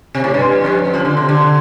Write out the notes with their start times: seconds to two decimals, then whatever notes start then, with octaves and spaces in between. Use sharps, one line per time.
0.14 C3
0.24 A2
0.34 G2
0.64 F2
0.94 F3
1.05 D3
1.17 C3
1.29 D3